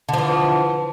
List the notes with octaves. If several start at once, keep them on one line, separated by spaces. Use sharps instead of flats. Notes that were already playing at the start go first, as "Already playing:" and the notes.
D3 E3 F3